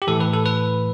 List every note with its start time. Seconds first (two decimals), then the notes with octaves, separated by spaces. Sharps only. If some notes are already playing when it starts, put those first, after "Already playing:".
0.02 G4
0.07 A2 E3 A4
0.20 B4
0.33 A4
0.46 B4